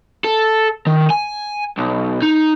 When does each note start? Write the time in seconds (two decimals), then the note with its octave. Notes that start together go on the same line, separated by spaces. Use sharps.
0.25 A4
0.86 D#3
1.10 G#5
1.78 B1
2.23 D#4